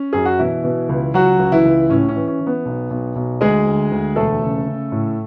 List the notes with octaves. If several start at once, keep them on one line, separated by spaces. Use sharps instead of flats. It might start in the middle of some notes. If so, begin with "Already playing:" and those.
Already playing: C#4
F#2 G#4
F#4
B2 E3 E4
B2
C#2
C#2 F#3 F#4
C#2
E3 E4
C#2
A2 C#4
C#4
E3
C#4
E3
B3
B1
B1
B1
D2 G#3 G#4
D2
D2
E1 A3 A4
C#3
C#3
A2